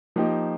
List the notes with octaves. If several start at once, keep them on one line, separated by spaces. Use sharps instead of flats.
F3 A#3 D#4 G4